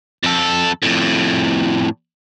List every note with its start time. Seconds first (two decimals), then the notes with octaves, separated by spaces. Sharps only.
0.23 F2 A4
0.83 F2 A2